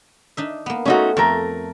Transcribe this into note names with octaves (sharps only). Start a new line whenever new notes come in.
D4 D#4 E5
A#3 B3
A3 C#4 D#4 F4 F#4 A4
F2 A3 A#4